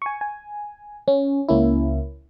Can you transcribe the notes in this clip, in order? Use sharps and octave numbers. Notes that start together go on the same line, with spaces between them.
G#5 C#6
G#5
C#4
C#2 A#3 C#4 E4